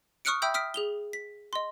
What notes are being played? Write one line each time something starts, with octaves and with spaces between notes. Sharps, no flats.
C#6 D#6 F6 F#6 C#7 D7
E5 G5 B5 D#6 E6 G6
D#6 F6 B6 D7
G#4 F7 G7
B6
D#5 C6